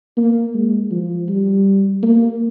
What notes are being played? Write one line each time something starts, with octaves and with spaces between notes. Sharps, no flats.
A#3
G#3
F3
G3
A#3